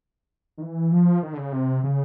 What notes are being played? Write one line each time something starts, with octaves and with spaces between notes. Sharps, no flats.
D#3
E3
F3
D#3
D3
C#3
C3
C#3